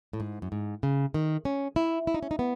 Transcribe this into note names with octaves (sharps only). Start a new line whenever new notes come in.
A2
G#2
F#2
G#2
C#3
D#3
C#4
E4
E4
D#4
C#4
D#4
B3